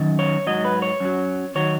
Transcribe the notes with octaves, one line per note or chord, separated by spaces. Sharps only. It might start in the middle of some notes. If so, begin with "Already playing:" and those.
Already playing: F#2 D#3
C#5
G#2 F#3 D#5
B4
C#5
F#2 F#3
D#3 F#3 C#5